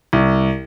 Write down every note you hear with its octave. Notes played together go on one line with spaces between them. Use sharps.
C2